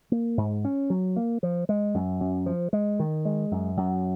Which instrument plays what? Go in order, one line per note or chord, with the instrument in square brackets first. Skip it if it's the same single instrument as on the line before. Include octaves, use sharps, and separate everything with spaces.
[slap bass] A#3
G#2
C#4
F#3
A#3
F3
G#3
F#2
F#2
F3
G#3
D#3
G#3
F#2
F#2